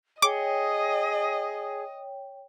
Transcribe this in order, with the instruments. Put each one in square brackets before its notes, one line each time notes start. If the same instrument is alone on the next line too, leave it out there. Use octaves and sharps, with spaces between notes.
[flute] G#4 [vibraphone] C#5 G5 [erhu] D#5 [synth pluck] D6